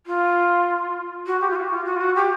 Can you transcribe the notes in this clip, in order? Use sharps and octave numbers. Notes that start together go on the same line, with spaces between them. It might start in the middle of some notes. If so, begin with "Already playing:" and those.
F4
F#4
G4
F4
F#4
F4
F#4
F4
F#4
G4